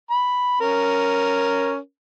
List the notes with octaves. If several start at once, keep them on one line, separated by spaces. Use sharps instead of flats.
B5
C#4 A#4